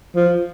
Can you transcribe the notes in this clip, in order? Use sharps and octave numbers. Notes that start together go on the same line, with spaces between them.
F3